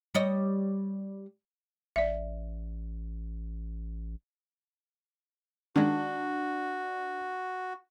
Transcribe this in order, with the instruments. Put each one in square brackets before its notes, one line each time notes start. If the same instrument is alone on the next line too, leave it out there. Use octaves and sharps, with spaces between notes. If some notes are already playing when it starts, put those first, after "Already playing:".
[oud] G3 C#5 D#5
[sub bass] A1 [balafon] D5 E5
[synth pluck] D#3 G#3 [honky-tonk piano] D4 [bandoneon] F#4